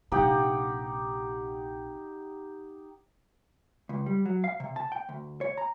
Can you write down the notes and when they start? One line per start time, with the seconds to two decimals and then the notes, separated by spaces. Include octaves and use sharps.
0.12 A#1 C3 D#4 G4 F#5
3.89 C#2
4.06 G3
4.26 F#3
4.44 F5
4.60 C3
4.76 A5
4.92 G5
5.09 D2
5.41 C#5
5.58 A#5